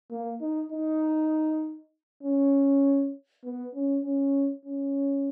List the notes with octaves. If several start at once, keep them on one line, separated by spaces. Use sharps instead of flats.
A#3
D#4
D#4
C#4
B3
C#4
C#4
C#4